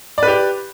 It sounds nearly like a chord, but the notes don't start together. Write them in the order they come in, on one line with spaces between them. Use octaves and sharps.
D5 B4 G4